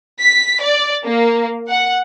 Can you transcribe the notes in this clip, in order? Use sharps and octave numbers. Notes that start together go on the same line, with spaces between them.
B6
D5
A#3
F#5